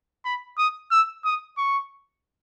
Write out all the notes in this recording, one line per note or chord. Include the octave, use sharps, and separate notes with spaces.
B5
D#6
E6
D#6
C#6